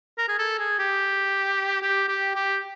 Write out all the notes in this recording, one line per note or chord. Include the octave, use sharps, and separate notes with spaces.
A#4
G#4
A4
G#4
G4
G4
G4
G4